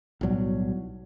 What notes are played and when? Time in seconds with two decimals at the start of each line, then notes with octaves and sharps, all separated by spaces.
0.21 B1 A2 F#3 G3